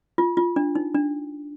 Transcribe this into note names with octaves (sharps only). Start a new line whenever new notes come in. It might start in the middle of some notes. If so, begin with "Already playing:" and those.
F4
F4
D4
D#4
D4